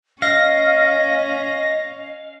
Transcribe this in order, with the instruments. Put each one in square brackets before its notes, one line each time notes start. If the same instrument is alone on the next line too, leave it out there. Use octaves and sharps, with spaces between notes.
[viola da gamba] C#4 [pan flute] D#5 [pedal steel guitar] F5 [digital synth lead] A#6